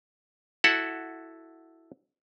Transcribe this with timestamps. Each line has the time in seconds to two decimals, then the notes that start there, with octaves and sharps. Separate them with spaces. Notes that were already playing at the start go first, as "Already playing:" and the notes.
0.64 E4 F#4 A4 F#5